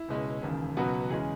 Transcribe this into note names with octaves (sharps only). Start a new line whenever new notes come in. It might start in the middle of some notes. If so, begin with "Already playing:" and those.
Already playing: E4
C#2 B2 G#3 C#4
E1 D#2 C#3
C#2 B2 F#3 B3 F#4
E2 C#3 G#3 C#4 G#4